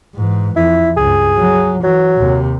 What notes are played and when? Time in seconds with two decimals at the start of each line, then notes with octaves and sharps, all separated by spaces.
0.15 G#2 E3
0.56 F2 E4
0.97 C#2 G2 G#4
1.38 F#3
1.84 E3 F#3
2.17 D#2 C3